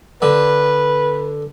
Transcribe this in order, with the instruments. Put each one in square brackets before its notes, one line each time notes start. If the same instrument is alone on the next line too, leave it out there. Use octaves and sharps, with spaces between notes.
[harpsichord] D3 [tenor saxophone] B4